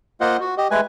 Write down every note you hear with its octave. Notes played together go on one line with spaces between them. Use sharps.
A#3 F4 C5 D#5 F#5
F#4
G4 D#5
G#3 A3 B4 G#5